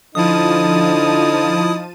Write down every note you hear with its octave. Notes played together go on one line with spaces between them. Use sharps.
D3 F3 D#4 E4 A5 D#6 D#7